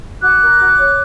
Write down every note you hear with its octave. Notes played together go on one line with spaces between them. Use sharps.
F#4 D6 F#6
A#4
F#4
C#5